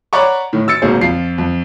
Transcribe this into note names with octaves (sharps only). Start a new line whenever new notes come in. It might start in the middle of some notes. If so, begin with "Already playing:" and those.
C#5 D5 F#5 A#5 B5 C#6
A2 D#3
E6 A6 C#7
G#1 G#2 B2 A#3 G#4 C5
F2 F4 C7
F2